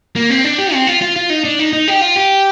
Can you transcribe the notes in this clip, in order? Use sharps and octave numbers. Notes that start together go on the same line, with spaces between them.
A#3
C4
D4
G4
C4
F4
F4
F4
D#4
D4
D#4
D#4
G4
F4
G4